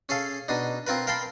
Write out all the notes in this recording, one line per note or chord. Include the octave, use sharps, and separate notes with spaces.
C#4 G#4 A4 F5
B2 D4 D#4
C4 F4 A#4 B4
A#4 F5 G5 A5 B5 C6